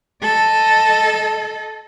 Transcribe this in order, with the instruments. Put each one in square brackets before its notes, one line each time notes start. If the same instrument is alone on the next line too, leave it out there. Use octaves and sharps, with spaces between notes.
[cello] A4 D#5